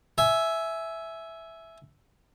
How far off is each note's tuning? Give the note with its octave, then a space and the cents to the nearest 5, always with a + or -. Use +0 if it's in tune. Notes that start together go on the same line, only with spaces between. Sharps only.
E5 +0 G#5 +20